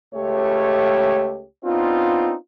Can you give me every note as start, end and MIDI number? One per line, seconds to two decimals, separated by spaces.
0.15 1.46 37
0.15 1.46 57
0.15 1.46 67
0.15 1.46 73
1.65 2.35 59
1.65 2.35 60
1.65 2.35 62
1.65 2.35 63
1.65 2.35 65